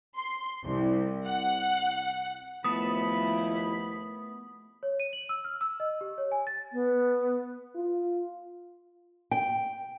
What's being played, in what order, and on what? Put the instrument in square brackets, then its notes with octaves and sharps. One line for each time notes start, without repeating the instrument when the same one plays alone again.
[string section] C6
C2
F#5
[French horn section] D#2 F3 E4 [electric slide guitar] A3 B3 [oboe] B5 [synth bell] D#6
[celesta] C#5
D#7
F#7
E6
F6
E6
D#5
G4
C#5
G#5
A6
[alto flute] B3
[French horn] F4
[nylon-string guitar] G5